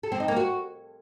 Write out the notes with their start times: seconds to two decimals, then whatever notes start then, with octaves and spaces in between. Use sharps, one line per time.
0.03 A4
0.12 C4
0.20 D#4
0.28 A#3
0.37 F#4